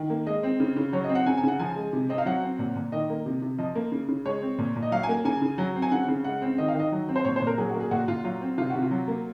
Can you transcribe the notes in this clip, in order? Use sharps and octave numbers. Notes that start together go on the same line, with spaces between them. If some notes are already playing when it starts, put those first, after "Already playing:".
Already playing: D#3
A#3
G#3 D#5
C4
C#3
C#3
F#3 C#5
D#5
C4
F#5
C#3 G#5
G#5
C#3 F#5
F3 G#5
G#3
C3
C4 D#5
F5
F#3 F#5
C4
A#2
A#2
D#3 D#5
A#3
C3
C3
F3 D#5
A#3
C#3
C#3
G#3 C#5
C4
A#2
A#2
D#5
F#3 F5
G#5
A#3
C#3 G#5
C#3
F#3
C4
G#5
C#3 F#5
C#3
G#3 F#5
C4
D#3 D#5
F5
D#3 D#5
F#3
C4
C5
A#2 C#5
C5
A#2
A#4
F#3 G#4
F#4
A#3
G#4
A#2 F#4
A#2 F4
F#3 F4
C4
C3 F4
C3 F#4
F4
F#3
A#3